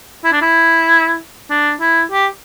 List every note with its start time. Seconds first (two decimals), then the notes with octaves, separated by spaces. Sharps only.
0.24 E4
0.32 D4
0.41 E4
1.50 D4
1.80 E4
2.12 G4